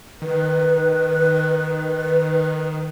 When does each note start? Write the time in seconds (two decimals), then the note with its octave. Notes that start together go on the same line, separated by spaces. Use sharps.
0.22 D#3 B4